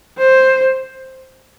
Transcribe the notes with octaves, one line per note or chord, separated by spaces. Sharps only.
C5